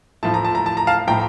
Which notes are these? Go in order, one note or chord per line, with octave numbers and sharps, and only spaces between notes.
A2 F3 A5
A#5
A5
A#5
A5
A#5
F5 A5
A2 F3 G5 A#5